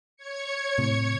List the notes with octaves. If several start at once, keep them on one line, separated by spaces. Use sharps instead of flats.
C#5 G#6 C#7
A2 C3